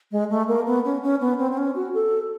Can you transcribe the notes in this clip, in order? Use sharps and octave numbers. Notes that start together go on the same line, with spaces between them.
G#3
A3
A#3
B3
C#4
C#4
B3
C4
C4
C#4
F#4
A4